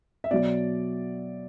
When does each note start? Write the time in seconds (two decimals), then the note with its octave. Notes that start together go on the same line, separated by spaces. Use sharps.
0.24 E5
0.31 B2 F#3 D5